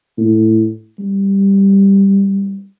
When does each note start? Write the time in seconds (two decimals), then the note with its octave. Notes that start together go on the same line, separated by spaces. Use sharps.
0.18 A2
0.99 G3